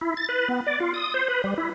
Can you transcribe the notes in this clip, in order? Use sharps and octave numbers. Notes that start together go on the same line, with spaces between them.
E4
A6
B4
B3
D5
F4
D#6
C5
B4
G3
E4